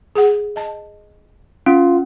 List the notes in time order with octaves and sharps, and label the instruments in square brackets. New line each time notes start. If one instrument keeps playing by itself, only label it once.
[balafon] G#4 F#5
D#5 A5
[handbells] C#4 [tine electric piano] F4